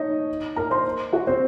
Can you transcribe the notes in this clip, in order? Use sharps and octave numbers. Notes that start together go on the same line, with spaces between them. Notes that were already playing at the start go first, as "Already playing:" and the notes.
Already playing: D#4 C#5 D#5
A#4 A#5
C5 C6
F#4 F#5
C4 C5